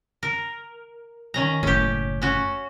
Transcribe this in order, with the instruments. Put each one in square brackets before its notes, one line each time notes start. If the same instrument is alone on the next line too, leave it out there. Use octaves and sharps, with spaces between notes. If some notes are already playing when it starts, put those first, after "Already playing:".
[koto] A#4
D#3 C#4 A#5
[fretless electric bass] F#1 A2 [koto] C#4 G4
[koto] C#4 F#4